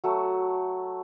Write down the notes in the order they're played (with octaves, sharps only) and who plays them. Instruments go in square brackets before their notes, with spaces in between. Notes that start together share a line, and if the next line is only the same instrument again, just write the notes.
[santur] F#3 A3